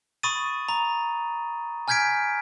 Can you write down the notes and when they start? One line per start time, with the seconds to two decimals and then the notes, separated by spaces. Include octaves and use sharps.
0.23 B5 C#6 D#6 A6 D#7
0.69 A#5
1.88 G#5 F6 G6 G#6 B6 D7